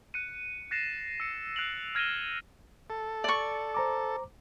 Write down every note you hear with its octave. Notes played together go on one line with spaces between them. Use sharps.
F#6 C#7 D#7
F#6 A6 A#6 C7 C#7 E7
E6 C#7
F#6 C7 D7 F7 F#7
F6 G#6 A#6 D#7 E7 G7
A4
D5 C#6
C5 A#5 D6